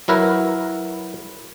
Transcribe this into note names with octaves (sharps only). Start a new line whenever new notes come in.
F#3 E4 A#4 B4